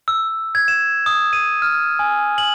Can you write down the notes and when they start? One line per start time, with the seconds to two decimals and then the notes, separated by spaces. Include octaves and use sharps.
0.08 E6
0.55 G#6
0.68 E7
1.06 D#6
1.33 D#7
1.62 F6
1.99 G#5
2.38 F#7